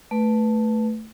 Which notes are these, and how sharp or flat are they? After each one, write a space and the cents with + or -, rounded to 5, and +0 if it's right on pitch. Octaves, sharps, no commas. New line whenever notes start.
A3 +0 B4 +0